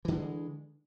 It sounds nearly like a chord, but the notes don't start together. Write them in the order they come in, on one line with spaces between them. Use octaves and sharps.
E3 D3 G#3